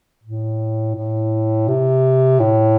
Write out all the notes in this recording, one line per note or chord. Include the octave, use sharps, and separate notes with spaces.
A2
A2
C3
A2